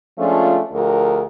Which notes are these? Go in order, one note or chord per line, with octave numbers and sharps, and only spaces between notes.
F3 G#3 A3 C#4 D4 F4
D2 F3 G#4 A#4